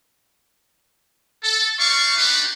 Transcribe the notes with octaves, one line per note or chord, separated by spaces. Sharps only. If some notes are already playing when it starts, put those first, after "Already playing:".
A4
C4 D5 F5 C#6
B3 D4 D#4 F#4 G4 B4